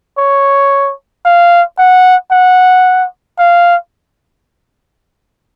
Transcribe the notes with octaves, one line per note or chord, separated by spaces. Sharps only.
C#5
F5
F#5
F#5
F5